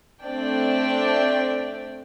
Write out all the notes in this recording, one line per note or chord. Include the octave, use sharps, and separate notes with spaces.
A3 C4 D4 D5 G5